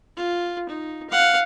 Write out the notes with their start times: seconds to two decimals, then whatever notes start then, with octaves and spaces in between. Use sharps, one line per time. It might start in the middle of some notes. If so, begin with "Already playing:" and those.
0.17 F4
0.69 D#4
1.10 F5 F#5